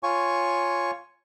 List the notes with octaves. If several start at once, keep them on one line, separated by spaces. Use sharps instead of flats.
F4 C#5 G#5 C#6